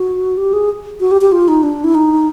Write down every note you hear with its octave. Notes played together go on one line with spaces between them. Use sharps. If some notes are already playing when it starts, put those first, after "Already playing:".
Already playing: F#4
G4
G#4
F#4
G4
G4
F4
D#4
D4
E4
D#4